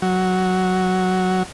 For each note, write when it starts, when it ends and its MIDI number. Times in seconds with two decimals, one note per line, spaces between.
0.02 1.43 54